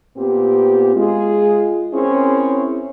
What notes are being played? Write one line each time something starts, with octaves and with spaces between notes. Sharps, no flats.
A#2 B3 C4 G4
G#3 F4 G#4
C4 C#4 E4 G#4 A#4 C#5